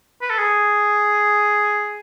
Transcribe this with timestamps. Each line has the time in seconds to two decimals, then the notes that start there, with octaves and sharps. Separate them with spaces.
0.22 B4
0.30 A4
0.39 G#4